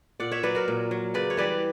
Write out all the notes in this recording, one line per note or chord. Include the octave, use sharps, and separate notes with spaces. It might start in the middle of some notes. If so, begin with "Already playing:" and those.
A#2 D5 F#5
C#5 E5
F#3 B4 D5
F#4 A#4
A#2
F#3
C#3 B4 D5
C#5
E3 G3 B4 D5